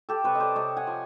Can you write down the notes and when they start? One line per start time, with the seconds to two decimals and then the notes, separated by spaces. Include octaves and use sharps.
0.09 G4 A4
0.24 C3 B4 C#5
0.35 D#5
0.40 C5 D5
0.55 C3 C#5 D#5
0.76 F#5 G#5
0.87 F3